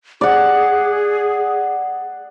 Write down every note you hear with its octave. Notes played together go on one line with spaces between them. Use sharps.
G#4 D5 F#5